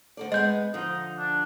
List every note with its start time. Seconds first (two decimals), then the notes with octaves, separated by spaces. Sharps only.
0.17 D2 A4 D5
0.32 G#3 B3 D#5 G6
0.74 D3 F3 D#4
1.18 D4